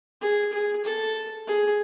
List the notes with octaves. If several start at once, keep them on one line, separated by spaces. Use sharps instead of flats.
G#4
G#4
A4
G#4